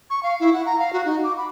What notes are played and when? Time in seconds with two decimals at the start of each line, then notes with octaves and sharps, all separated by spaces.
0.10 C#6
0.23 F5
0.40 E4
0.53 F#5
0.66 A#5
0.79 F5
0.93 F#4
1.05 D#4
1.24 D6
1.37 B5